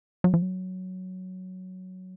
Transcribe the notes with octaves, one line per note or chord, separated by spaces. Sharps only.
F#3
F3
F#3